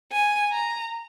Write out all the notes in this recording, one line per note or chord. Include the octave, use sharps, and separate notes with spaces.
G#5
A#5